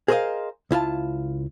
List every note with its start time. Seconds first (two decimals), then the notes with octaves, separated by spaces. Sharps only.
0.08 G#4 A#4 C5 D5 D#5 F5
0.71 C#2 E4 F4 A5